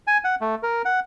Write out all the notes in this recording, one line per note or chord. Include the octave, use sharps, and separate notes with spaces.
G#5
F#5
A3
A#4
F#5